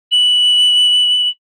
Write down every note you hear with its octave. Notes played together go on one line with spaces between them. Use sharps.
F#7